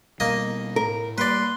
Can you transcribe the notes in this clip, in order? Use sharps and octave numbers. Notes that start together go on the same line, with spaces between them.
B2 G3 A#3 D#5
A2 A#4
G3 A#3 B4 D5 C6